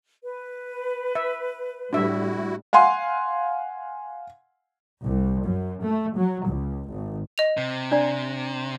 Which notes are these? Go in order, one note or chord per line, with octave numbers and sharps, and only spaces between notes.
B4
E5
A2 G3 D4 E4 F#4 E5
F5 F#5 G#5 C6
C2
F#2
A3
F#3
C#2
G#1
D#5 F7
C3
D4 D5 A#5